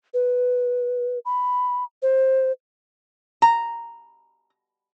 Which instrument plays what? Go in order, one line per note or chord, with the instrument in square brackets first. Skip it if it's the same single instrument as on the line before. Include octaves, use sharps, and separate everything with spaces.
[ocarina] B4
B5
C5
[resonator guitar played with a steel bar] A#5